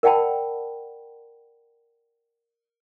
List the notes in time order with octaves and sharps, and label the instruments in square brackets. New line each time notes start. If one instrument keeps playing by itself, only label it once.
[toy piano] A#4 D5 F#5 G5 A5 B5